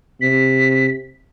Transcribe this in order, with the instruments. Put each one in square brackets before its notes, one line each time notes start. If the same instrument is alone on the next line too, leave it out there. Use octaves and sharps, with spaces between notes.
[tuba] C3 [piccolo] B6